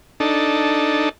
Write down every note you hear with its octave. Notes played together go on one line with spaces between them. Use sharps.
D4 D#4 A4